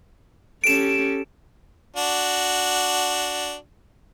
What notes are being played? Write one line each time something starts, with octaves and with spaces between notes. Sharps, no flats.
C#4 G4 A4 D7 E7
D4 F#4